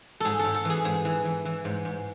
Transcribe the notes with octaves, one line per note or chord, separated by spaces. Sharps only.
G#2 G#4 A4
G#2 A4
A4
E3 G#4
G#2 G#4
E3
E3
E3
G#2
G#2